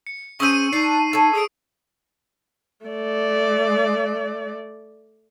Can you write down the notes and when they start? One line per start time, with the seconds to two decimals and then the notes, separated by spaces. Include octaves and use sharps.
0.07 C#7
0.40 C#4 G#4 C5 C#6 E6 D#7
0.73 D4 D#4 C7
1.13 A4 C#5
1.33 G#4 D#6 D7
2.86 A3 D5